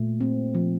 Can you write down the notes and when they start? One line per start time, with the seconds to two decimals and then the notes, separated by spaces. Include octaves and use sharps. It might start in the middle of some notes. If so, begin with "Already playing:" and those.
Already playing: A#2 A3
0.21 C4
0.55 F3